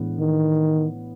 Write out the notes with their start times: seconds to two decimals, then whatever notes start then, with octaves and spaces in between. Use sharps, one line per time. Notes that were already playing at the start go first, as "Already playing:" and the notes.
Already playing: A2 E3 G#3 B3 D4
0.19 D#3